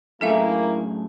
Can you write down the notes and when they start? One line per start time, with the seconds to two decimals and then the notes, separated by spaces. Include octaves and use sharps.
0.21 F#2 A2 A#3 E4 G#4 A4 E5 F5